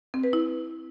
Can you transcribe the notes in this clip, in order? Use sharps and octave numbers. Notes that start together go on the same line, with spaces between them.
C4
B4
E4